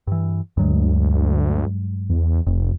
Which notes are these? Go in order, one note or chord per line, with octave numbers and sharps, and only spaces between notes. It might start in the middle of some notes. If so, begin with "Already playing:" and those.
G2 E3
D2 G2 F#3 G#3
E2
F1 F2